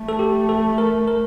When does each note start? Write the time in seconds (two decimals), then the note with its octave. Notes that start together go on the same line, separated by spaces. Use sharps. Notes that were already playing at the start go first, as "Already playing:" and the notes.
Already playing: A3
0.09 A4
0.19 G4
0.49 A4
0.78 A#4
1.07 A#4